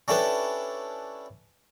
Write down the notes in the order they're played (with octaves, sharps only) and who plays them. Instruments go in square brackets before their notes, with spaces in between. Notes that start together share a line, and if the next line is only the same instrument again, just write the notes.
[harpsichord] C#4 D4 E4 G4 A4 B4